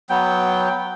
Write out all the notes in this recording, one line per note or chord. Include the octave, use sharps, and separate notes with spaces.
F#3 B3 G5